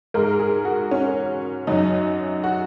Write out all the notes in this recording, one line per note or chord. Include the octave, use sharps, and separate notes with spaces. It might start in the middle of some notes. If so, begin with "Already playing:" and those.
G#2 G#3 A#4
G#4
F#4
C#4
F#2 F#3 D#4
F#4